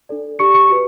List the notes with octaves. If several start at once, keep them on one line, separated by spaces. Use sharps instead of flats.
D4 A4 D5
D4 G4 D5 C#6 C#7
C#6 C#7
F#4 B4